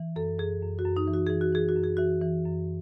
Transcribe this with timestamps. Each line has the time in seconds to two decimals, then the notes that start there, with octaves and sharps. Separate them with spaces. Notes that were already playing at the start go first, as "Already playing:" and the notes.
Already playing: E3
0.16 F#2 A4
0.38 F#2 G#4
0.62 F#2
0.79 F#4
0.85 F#2
0.97 D#4
1.07 E3
1.13 F#4
1.27 E3 G#4
1.41 F#4
1.53 E3 G#4
1.69 F#4
1.76 F#2
1.84 G#4
1.97 E3 F#4
2.21 E3
2.45 F#2